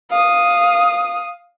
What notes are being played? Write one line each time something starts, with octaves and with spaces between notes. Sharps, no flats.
F5 D#6